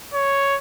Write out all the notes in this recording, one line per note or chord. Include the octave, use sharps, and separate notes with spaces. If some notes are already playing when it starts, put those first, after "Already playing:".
C#5